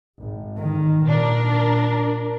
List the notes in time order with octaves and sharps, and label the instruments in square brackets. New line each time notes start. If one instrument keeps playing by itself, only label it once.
[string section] G#1
[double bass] D#3
[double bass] A#2 [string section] D4 A#4